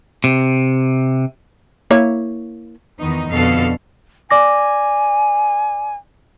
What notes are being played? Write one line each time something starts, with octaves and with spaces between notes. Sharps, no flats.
C3
A#3 E4 C#5
E2 D#3 B3 D#4
F2 B2 D3 A4 F5
D5 G#5 D6 A#6